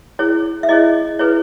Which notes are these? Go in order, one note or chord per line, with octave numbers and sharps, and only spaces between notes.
E4 G#4 C#5
E5
E4 G#4 C#5 D#5
E4 G#4 B4 C#5